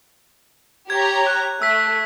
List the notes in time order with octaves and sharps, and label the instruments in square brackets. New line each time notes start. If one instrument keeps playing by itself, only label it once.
[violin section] G4 C#5 A#5 [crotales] G#6
[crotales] F#6
[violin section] A3 [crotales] E6 B6